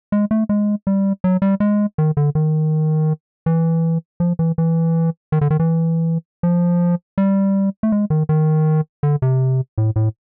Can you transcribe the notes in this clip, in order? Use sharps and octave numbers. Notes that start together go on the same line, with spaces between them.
G#3
A3
G#3
G3
F#3
G3
G#3
D#3
D3
D#3
E3
F3
E3
E3
D#3
D3
D#3
E3
F3
G3
A3
G#3
D#3
D#3
D3
C3
A2
A2